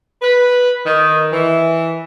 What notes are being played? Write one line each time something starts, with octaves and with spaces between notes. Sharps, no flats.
B4
D#3
E3